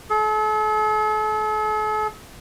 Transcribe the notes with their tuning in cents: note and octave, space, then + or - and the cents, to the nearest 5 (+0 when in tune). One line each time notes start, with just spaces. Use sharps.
A4 -45